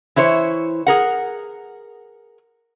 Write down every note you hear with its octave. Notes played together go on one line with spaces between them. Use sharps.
E3 E4 C5 C#5
G#4 A#4 F#5